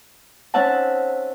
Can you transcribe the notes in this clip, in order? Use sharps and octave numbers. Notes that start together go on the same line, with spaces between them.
C4 C#4 D#4 E5 F#5 A5